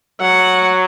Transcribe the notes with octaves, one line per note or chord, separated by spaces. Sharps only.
F#3 F#5